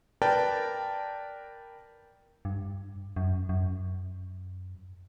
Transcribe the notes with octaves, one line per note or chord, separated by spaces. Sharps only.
A#4 B4 D5 G5 A5
G2
F#2
F#2